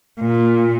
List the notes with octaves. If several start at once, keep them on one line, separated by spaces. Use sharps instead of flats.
A#2